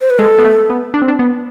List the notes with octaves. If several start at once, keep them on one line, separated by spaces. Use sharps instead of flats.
C5
B4
G#3 A4
B3
A3
B3
D4
C4
D4
B3